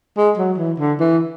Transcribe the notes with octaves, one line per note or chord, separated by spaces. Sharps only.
G#3
F#3
E3
D3
E3